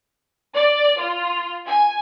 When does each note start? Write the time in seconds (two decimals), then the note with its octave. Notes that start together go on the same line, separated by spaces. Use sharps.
0.55 D5
0.99 F4
1.66 G#5